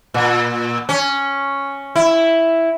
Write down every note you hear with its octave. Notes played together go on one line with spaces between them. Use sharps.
A#2
C#4
E4